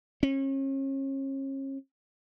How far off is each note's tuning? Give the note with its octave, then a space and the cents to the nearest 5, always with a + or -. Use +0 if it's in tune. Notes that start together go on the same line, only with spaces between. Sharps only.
C#4 -35